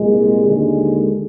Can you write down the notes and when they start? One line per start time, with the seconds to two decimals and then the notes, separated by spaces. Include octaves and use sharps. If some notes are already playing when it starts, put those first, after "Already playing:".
Already playing: C2 A#2 G#3
0.43 D#2 D3 G#3